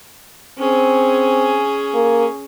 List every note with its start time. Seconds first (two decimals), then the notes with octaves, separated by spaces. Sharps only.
0.59 C4 C#4 G#4
1.94 A#3